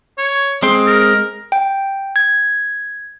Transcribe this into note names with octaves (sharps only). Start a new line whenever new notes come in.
C#5
G#3 C4 G#4 G5 C6
A#4
G5
G#6